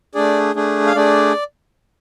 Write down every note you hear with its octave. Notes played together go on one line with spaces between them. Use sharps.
A3 D4 G#4 D5
A3 D4 G#4
F5
A3 D4 G#4 D5